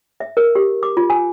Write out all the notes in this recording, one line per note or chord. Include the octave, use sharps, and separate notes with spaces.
E5
A#4
G4
D6
F4
G#5